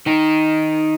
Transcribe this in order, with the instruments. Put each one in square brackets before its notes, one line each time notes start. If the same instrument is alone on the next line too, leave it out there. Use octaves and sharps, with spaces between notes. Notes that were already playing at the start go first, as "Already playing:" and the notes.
[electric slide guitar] D#3 D#4